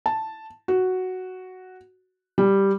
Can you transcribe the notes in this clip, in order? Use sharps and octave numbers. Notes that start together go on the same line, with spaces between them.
A5
F#4
G3